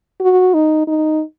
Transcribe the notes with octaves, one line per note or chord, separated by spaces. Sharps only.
F#4
D#4
D#4